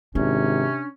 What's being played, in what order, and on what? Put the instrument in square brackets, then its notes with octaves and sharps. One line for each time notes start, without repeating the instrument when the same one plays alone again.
[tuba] G#1 [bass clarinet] C3 [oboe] C#4 [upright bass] D4